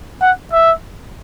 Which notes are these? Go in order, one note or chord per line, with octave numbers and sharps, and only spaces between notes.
F#5
E5